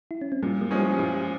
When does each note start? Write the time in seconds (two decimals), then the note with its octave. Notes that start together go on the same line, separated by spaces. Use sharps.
0.11 E4
0.21 C#4
0.32 C4
0.43 A#2 G3 A#3
0.61 G3 A#3
0.71 F3 G#3 C#4
0.80 E4 G4
0.90 F4
0.99 A#2 E4 G4